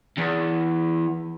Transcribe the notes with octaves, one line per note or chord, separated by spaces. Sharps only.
E2